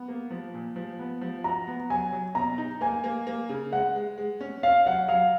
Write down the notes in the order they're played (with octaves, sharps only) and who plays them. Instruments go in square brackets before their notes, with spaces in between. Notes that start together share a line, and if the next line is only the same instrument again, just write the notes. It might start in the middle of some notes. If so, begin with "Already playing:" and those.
Already playing: [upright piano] B3
A#3
F3
A#2
F3
B3
F3
[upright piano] F#4 [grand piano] A#5
[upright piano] B3
[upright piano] F#3 [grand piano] G#5
[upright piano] F#3
[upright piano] B2 [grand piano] A#5
[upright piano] D#4
[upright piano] A#3 [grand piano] G#5
[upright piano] A#3
A#3
C#3
[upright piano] G#3 [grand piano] F#5
[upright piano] G#3
G#3
C#4
[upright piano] C#4 [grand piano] F5
[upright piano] F#3 [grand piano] F#5
[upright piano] F#3 [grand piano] F5